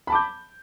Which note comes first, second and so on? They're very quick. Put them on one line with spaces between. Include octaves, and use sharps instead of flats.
B5 A5 D6 G6